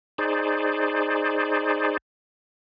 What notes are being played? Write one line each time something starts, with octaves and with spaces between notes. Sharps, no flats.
D#4 G#4 C5 D5